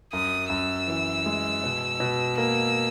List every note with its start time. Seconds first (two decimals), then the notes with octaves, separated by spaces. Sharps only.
0.13 F#2 D#6
0.50 F#2 E6
0.88 E3
1.26 G#3
1.64 B2
2.00 B2
2.38 A#3 E6